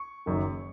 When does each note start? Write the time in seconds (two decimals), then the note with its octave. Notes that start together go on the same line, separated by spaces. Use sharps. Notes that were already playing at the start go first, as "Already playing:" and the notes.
Already playing: C#6
0.26 F#1 F#2 D#3